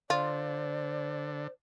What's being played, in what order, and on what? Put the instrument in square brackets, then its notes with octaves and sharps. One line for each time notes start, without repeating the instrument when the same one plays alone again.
[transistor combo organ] D3 [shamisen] F4 [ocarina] C5 [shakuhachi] D5